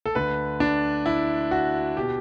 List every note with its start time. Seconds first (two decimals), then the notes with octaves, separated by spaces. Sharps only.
0.06 A4
0.15 D2 D3 B4
0.60 D4
1.06 E4
1.51 F#4
1.97 B2 G4